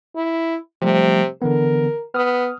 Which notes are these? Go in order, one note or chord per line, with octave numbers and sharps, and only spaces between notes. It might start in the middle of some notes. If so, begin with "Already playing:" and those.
E4
C3 F3 G3 A3
D3 E3 B3 A#4
B3 D#6 F6